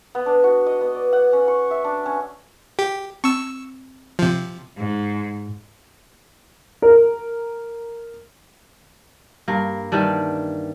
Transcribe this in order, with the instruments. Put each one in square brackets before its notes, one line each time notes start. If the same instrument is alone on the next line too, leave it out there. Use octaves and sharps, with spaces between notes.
[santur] B3
D4
F#4
D#5
B3
D5
F#5
C#4
C#6
E5
D4
C#4
[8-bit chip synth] G4
[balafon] C4 [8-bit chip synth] C#6 E6
[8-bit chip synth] C3 F3
[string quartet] G#2
[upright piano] A#4
[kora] G2 A#3
D#3 E3 G3 D4